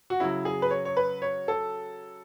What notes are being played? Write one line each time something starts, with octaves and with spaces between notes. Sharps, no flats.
F#4
C#3 F#3 E4
G#4
B4
C#5
C#5
B4
C#5
A4